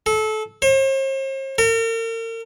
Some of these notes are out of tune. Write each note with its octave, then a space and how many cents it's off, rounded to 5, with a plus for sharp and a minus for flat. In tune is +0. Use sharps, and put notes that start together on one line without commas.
A4 -25
C5 +45
A#4 -40